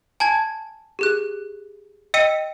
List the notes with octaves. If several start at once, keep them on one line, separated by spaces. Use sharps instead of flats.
G#5 A5 G#6
G4 G#4 F#6
D#5 G5 E6 B6 C#7 D#7